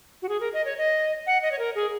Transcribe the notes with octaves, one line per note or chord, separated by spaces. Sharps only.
F#4
G#4
A#4
D#5
C#5
D#5
F#5
D#5
C#5
A#4
G#4